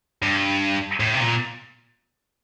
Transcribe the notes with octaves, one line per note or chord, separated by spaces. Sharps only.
G2
A2
C3
A#2